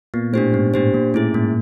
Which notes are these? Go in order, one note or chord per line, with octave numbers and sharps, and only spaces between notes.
A#2 B3
A2 D4 G4 C5
G#2 B3
A2 D4 G4 C5
A#2 A#3
A2 C#4 E4 G#4
G#2 A#3